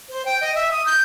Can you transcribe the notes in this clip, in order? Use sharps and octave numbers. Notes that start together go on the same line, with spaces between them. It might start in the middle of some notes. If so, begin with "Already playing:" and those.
C5
G5
D#5
E5
D#6
G6